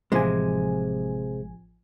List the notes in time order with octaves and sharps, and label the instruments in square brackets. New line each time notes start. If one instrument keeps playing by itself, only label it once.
[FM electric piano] A1 F3 G#5 [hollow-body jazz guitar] C3 G#3